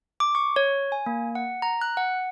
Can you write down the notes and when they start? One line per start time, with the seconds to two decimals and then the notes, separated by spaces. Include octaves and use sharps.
0.20 D6
0.35 C#6
0.56 C#5
0.92 G#5
1.06 A#3
1.35 F#5
1.62 A#5
1.81 F#6
1.97 F#5